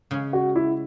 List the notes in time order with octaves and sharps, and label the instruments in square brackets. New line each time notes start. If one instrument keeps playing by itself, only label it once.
[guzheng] C#3 G#3 C#4
[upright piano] F#4
E4